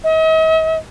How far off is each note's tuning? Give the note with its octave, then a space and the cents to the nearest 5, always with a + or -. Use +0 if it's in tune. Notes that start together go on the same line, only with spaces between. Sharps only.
D#5 +45